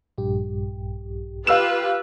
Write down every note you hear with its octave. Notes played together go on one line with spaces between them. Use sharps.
A#1 G2 G4
F4 G4 B4 F5 E6 E7